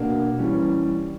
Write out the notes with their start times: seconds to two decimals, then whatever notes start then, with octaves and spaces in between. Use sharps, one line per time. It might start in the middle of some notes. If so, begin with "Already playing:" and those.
Already playing: B2 A#3 D4
0.39 E3 G3 C#4